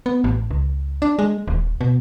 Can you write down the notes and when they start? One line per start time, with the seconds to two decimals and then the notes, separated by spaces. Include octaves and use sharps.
0.06 B3
0.24 A1
0.51 C#2
1.02 D4
1.19 G#3
1.47 D#1
1.81 B2